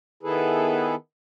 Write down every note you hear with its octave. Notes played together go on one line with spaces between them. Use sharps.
D#3 B3 E4 G#4 A4 B4